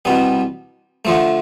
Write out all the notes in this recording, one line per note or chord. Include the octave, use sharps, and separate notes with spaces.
C2 B2 G3 B3
D3 F3 A3